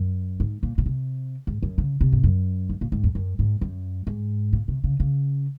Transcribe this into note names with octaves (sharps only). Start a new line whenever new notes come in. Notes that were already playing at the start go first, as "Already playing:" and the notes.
Already playing: F#2
G#2
A#2
A#2
C3
G#2
F#2
C#3
C3
G#2
F#2
G#2
A#2
G#2
F2
F#2
G#2
F#2
G#2
A#2
C3
C#3
C#3